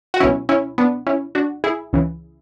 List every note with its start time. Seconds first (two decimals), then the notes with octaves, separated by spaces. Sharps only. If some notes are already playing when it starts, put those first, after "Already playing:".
0.14 F#4
0.20 C#2 B2 F#3 C#4 E4
0.49 C#4 E4
0.78 B3 D4
1.07 C#4 E4
1.35 D4 F#4
1.64 E4 G#4
1.93 C#2 C#3 E3